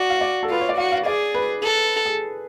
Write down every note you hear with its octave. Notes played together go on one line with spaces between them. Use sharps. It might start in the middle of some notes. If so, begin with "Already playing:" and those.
Already playing: F#4 D5
F5
D5
A4
F4 B4
C#5
D5
F#4 F5
F5
G#4 D5
B4
A4
G#4